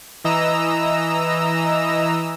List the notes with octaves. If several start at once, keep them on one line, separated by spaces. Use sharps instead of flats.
E3 D#5 A#5 E6